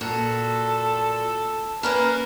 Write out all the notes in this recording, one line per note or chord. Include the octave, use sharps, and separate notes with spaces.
A#2 F#4 A4
A#3 C#4 A#4 B4